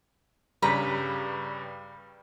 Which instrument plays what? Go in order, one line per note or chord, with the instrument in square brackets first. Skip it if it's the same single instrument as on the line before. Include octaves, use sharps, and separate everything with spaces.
[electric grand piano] G2 C#3 G3 [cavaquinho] B4 A#5 B5